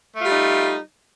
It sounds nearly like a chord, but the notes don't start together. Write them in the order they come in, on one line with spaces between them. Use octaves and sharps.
A3 F4 G3 D#4